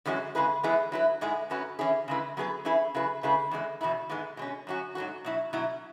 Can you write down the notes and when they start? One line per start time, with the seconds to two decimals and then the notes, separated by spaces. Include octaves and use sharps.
0.05 F#2 E3 G#3 C#4 F#4
0.35 C#3 G#3 E4 G#4 B4
0.63 E3 G#3 B3 E4 G#4
0.92 F#3 E4 B4
1.21 G#2 G#3 E4 G#4
1.50 F#2 F#3 C#4 F#4 B4
1.79 E3 C#4 E4 G#4
2.08 C#3 G#3 E4 B4
2.37 F#3 B3 G#4 B4
2.65 E3 C#4 E4 G#4 B4
2.94 C#3 F#3 E4 G#4 B4
3.23 C#3 G#3 E4 G#4 B4
3.51 E2 E3 G#3
3.81 E2 B2 B3 E4
4.09 G#2 E3 G#3 B3
4.37 B2 G#3 C#4
4.67 F#2 F#3 C#4 F#4
4.95 G#2 F#3 B3 F#4
5.24 B2 F#3 E4
5.53 B2 F#3 E4